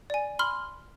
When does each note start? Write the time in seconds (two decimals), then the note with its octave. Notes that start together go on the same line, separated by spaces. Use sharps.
0.10 D5 G#5
0.39 B5 C6 F6